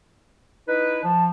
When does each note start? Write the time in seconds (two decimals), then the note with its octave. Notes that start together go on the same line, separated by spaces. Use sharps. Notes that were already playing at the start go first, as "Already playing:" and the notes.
0.68 D#4 E4 B4
1.04 F3 A5